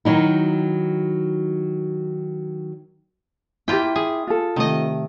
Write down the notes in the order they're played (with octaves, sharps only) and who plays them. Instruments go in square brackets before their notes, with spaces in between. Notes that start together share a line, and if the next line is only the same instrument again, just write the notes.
[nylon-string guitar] D#3 F#3 D#4 E4
[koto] A#3 F4 G5 [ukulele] E4 G4
[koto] G#4
[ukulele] F4 A4
[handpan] C3 A3 [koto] D#3 D#5